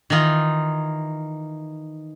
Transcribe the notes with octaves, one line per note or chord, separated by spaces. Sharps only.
D#3 E3 D#4 F4